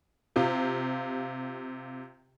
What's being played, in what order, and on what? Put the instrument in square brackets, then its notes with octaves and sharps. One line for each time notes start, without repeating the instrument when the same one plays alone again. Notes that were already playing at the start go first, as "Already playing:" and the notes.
[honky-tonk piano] C3 F4 G4